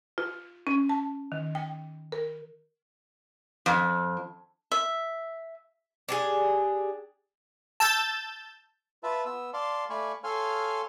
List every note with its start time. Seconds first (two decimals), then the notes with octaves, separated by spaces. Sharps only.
0.18 F4
0.67 C#4
0.89 A5
1.32 D#3
1.55 G5
2.12 A#4
3.66 F2
4.72 E5
6.09 D4 G4 G#4
7.80 A5 E6 G6 A6
9.03 F4 B4 E5 A5
9.25 B3 E6
9.53 D5 F5 A5 C6
9.90 A3 D5 F5 G#5 B5 C#6
10.24 A4 C#5 F5 G#5 C6 F6